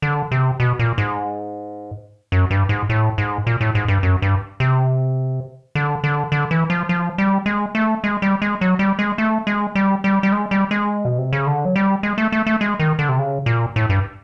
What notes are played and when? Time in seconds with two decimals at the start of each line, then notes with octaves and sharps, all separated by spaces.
0.02 D3
0.31 C3
0.60 B2
0.79 A#2
0.98 G#2
2.32 F#2
2.51 G2
2.69 G#2
2.90 A2
3.18 G#2
3.47 A#2
3.61 A2
3.75 G#2
3.88 G2
4.03 F#2
4.22 G2
4.60 C3
5.75 D3
6.04 D3
6.32 D3
6.51 E3
6.70 F3
6.89 F3
7.18 G3
7.46 G#3
7.75 A3
8.04 G#3
8.22 G3
8.42 G#3
8.61 F#3
8.79 G3
8.99 G#3
9.18 A3
9.47 G#3
9.75 G3
10.04 G3
10.23 G3
10.32 G#3
10.51 G3
10.71 G#3
11.05 B2
11.18 C3
11.33 C#3
11.47 D3
11.65 F#3
11.76 G3
12.03 G#3
12.18 A3
12.32 A3
12.47 A3
12.61 G#3
12.80 D#3
12.99 D3
13.09 C3
13.19 C#3
13.46 A#2
13.76 A2
13.90 G2